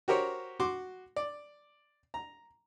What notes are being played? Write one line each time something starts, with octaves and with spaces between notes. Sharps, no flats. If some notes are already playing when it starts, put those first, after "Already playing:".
F#4 G4 A#4 C5 C#5
F#4 C6 D6
D5
A#5